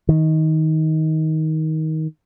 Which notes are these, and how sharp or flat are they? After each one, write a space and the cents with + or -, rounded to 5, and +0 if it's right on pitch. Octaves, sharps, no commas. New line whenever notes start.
D#3 +20